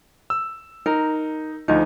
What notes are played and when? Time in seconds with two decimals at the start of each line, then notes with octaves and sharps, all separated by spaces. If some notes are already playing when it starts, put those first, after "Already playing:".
0.30 E6
0.86 D#4 A#4
1.68 D2 F3 D#4